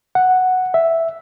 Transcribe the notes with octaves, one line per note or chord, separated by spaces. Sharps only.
F#5
E5